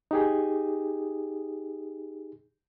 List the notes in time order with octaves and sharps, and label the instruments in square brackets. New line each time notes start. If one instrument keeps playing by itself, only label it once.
[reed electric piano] D#4 G4 G#4